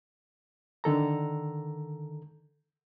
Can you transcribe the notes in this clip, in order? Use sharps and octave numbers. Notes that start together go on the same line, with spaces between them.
D3 D#3 A4 A#5